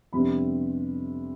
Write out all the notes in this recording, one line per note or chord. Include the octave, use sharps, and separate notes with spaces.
F2 C3 G3 B3 D4 B5